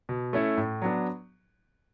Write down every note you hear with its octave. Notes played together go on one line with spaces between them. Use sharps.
B2
A3 C#4 E4
A2
F#3 B3 D4